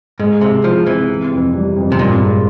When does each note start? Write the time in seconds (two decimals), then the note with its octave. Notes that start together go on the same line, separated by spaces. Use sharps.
0.19 G#2 G#3
0.41 C3 G#3
0.64 F3 E4
0.87 C3 E3
1.09 C3
1.32 F2
1.55 G3
1.76 F2
1.92 C3
1.98 G2 A#2
2.22 G#3